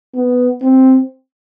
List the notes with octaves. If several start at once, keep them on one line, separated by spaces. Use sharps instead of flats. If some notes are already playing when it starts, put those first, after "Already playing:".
B3
C4